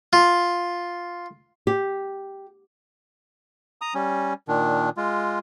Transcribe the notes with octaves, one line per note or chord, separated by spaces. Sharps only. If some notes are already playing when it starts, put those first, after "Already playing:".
F4
G4
A#5 D#6
G3 C#4
A#2 D#3 D4
G#3 F4